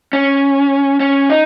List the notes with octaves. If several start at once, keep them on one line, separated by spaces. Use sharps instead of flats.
C#4
C#4
D#4